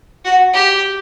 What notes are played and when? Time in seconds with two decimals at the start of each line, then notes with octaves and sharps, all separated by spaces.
0.25 F#4
0.54 G4